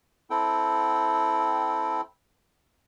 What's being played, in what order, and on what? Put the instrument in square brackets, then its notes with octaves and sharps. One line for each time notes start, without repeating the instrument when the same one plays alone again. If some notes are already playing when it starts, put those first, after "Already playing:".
[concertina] C4 E4 A4 G5